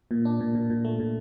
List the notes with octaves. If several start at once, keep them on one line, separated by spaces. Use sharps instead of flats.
A#2
D4
A#2
A#2
A#2
A3
A#2